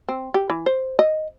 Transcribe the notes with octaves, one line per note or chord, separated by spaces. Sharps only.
C4
G4
E3
C5
D#5